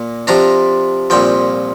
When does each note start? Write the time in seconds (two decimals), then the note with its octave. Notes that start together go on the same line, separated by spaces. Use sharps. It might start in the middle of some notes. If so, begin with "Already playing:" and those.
Already playing: A#2 A#3
0.27 C3 F3 D4 A#5
1.10 C2 A#2 F3 G5